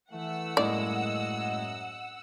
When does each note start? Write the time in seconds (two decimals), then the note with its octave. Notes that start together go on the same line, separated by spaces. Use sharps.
0.12 E3 A3 F#5 E6
0.57 F#2 A2 G#3 A#3 D5 D#5